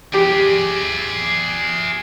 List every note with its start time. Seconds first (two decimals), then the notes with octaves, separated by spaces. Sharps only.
0.14 G4 G#4 D5